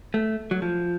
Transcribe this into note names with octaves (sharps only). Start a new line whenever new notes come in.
A3
F#3
F3